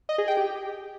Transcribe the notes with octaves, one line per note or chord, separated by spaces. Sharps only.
D#5
G#4
G5
G4